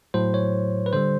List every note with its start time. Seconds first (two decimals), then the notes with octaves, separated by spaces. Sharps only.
0.14 A2 F#3 C5
0.34 C#5
0.86 B4
0.93 D3 G3 C5